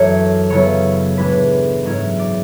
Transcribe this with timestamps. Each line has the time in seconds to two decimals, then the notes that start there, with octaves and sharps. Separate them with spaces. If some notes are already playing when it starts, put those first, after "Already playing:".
Already playing: F#2 E3 A3 C#5
0.50 C#3 F#3 B3 E4 C#5
1.17 A2 E3 G#3 D4 B4
1.85 G#2 F#3 C#4 E4
2.19 D5